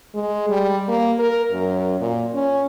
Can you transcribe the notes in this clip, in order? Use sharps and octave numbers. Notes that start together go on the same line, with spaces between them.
G#3
G3
A#3
A#4
F#2
A#2
C#4